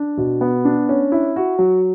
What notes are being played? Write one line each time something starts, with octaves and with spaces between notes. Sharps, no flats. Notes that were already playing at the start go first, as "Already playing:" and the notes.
Already playing: D4
B2
B3
D4
C#4
E4
F#4
F#3